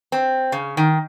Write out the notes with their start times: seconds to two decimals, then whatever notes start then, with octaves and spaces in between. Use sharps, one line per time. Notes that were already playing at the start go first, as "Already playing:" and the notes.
0.12 C4
0.52 C#3
0.77 D#3